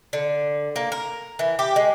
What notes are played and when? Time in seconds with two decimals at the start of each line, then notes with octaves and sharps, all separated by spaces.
0.13 D3
0.76 A#3
0.92 A#4
1.39 E3
1.59 G4
1.76 G#3